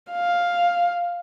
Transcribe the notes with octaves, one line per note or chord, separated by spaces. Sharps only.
F5